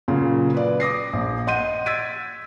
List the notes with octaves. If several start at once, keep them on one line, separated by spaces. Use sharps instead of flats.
A#2 C#3 F#3 F4
B4 D5
D6 D#6 A#6 C7
A#1
D#5 F#5 C6 G6 D#7
E6 G#6 A6 B6 D7 D#7